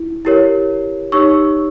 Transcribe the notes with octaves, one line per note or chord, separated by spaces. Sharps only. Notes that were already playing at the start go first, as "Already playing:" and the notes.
Already playing: E4
E4 G4 A#4 C#5
D#4 G4 C#5 C#6 E6